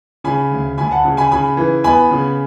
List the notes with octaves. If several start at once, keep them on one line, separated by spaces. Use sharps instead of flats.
C#3 G#5 B5
D2
D2 G#5 B5
F#5 A5
C#3
G#5 B5
C#3 G#5 B5
E3
B3 G#5 B5
C#3